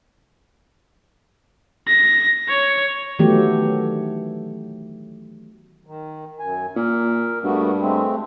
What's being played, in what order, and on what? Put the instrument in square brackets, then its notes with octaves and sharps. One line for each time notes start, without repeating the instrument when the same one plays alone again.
[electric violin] A#6
C#5
[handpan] D#3 E3 F#3 A3 B3 G4
[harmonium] D#3
F#2 G#5
[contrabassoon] A#2 [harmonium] A#4
[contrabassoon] G2 [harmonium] A3 B3 F#4
[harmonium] G#3 A3 C4